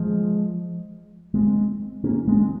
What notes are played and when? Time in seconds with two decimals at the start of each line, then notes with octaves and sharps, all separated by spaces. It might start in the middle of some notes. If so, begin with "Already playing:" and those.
Already playing: F3 G#3
1.34 G#3 C4
2.04 A#3 C#4
2.28 G#3 C4